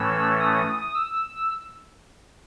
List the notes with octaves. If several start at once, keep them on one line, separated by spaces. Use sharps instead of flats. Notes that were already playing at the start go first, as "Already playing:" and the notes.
Already playing: A2 E3 A3 C#4 E6
D#6
E6